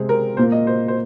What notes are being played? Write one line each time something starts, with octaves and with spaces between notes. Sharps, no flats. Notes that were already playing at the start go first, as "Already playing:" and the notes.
Already playing: C3 G#3 C4 G#4
A#4
A#2 A#3 F4 A#4 C5
D#5
C5
C5